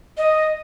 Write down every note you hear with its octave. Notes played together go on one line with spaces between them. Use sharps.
D#5